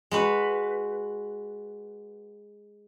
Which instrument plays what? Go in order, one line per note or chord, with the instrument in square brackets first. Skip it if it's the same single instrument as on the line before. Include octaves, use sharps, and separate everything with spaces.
[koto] G#3 F#4 B4